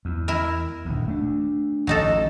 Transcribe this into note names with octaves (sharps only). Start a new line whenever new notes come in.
E2
E4 A#4
D#1 D2
A3 D4
D1 A1 F#3 D#4 A4